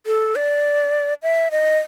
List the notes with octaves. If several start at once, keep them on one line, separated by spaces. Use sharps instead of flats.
A4
D5
E5
D#5